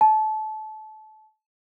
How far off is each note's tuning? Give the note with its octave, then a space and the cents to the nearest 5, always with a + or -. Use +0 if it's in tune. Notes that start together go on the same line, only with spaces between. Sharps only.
A5 -25